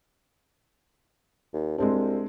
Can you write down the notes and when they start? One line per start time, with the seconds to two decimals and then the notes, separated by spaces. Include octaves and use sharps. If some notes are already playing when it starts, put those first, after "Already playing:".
1.54 D#2
1.78 C2 G#3 C4 D4